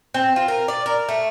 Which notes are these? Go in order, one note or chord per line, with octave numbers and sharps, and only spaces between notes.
C4
F4
A#4
D5
A#4
A3